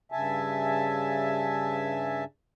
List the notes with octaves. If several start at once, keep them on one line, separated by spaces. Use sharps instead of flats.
G2 C#3 E5 G#5 A5